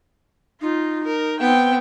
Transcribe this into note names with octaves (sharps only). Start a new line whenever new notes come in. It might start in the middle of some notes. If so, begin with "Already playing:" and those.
D#4 F4
A#4
B3 C4 G5